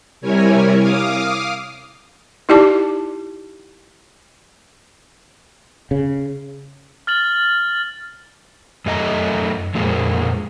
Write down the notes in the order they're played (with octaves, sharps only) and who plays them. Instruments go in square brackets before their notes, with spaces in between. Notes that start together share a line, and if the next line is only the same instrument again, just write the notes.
[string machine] C3 G3 E4 A#4 C#5 G#5
F5 D6 D#6 F6
[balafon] D#4 E4 G4 D5 A5 D6
[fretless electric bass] C#3
[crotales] F6 A6 F#7
[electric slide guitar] F#2 A3 D#5 A#5
F2 A#2 G#3 A#3